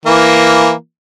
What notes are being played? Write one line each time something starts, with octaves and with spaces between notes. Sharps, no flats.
E3 A#3